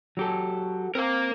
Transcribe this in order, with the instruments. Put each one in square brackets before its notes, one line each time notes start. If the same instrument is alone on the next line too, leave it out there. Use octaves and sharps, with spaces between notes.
[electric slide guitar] F#3 G4 A4 [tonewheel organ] F#4
[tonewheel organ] C4 [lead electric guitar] A#4 F5